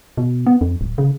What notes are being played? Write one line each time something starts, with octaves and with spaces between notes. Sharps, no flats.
B2
B3
F2
D1
C#3